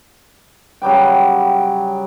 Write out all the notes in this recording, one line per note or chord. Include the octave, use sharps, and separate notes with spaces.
C#3 F#3 G3 G5